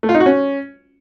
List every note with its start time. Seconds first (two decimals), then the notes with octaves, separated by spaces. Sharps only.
0.03 A3
0.09 F4
0.14 D#4
0.20 F#4
0.26 C#4